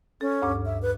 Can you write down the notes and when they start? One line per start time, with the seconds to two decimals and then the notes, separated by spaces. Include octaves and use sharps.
0.21 C#4 A4
0.42 D2 G2 D6
0.65 E5
0.82 B4